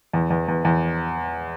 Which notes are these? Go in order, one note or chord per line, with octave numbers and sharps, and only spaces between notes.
E2
E2
E2
E2